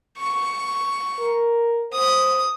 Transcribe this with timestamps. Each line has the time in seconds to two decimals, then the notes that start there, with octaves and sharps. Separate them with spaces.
0.17 C#6
1.20 A#4
1.93 C5 D#6